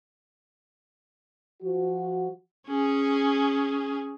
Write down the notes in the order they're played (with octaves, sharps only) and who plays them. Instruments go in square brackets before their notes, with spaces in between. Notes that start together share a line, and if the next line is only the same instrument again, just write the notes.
[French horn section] F3 F#4
[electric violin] C#4 G#4